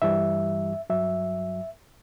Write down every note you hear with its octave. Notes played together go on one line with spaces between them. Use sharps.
G2 E3 G3 E5
G2 F#3 E5